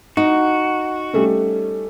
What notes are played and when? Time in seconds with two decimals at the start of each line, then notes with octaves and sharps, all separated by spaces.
0.17 D#4 F#4
1.13 G3 A3 C#4